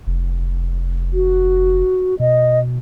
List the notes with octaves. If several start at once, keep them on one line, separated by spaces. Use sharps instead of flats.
F1
F#4
B2 D#5